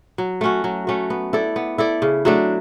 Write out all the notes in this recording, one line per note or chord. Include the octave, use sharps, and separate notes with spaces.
F#3
A3 C#4 F#4
F#3
A3 C#4 F#4
B3
E4 A4 D5
B3
E4 A4 D5
C#3
F#3 A3 D4